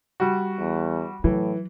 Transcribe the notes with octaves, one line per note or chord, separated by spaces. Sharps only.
G3 F#4
E2
A2 E3 F#3